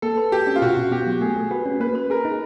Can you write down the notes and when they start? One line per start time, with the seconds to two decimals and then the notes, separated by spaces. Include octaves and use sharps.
0.02 A#3 A4
0.17 B4
0.32 F#4 G4
0.47 C#4
0.56 F4
0.62 B2 F#4
0.77 B2
0.91 B3 G4
1.07 F#3
1.21 A3 G#4
1.36 A3
1.51 F#4 B4
1.66 C#4
1.80 A#3 B4
1.95 B4
2.10 G#4 A#4
2.25 D#4